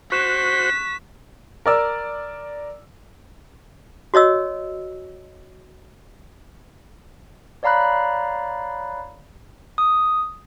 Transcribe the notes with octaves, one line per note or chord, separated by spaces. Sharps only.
F#4 C5 C#6 F#6 B6 E7
A#4 D5 E6
F#4 C#5 D#5 E6
C#5 D5 F5 A#5 B5 F#6
D#6